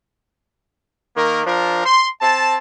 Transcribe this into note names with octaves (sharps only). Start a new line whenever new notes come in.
D#3 A#3 A#4
F3 D4 A#4
C6
C4 A5